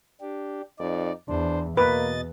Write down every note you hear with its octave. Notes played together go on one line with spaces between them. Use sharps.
D4 G4
F2 D#4 D5
E2 D4 C5
E2 B2 A#3 B4 D#5 A6